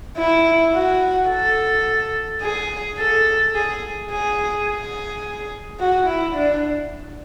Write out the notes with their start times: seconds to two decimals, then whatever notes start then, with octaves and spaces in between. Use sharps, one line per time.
0.17 E4
0.74 F#4
1.29 A4
2.42 G#4
2.98 A4
3.55 G#4
4.10 G#4
4.66 G#4
5.79 F#4
6.07 E4
6.35 D4